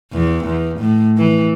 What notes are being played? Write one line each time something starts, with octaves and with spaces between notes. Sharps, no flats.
E2
E2
A2
E3